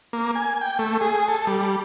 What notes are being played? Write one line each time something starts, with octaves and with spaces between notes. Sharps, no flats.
A#3
G#5
G5
A3
G#4
A4
G3